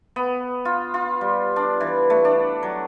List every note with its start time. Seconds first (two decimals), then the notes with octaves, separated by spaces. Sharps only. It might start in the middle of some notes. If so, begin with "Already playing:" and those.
0.16 B3
0.65 F4
0.94 F4
1.21 G3
1.56 D4
1.81 E3
2.10 A3
2.25 D4
2.63 F#3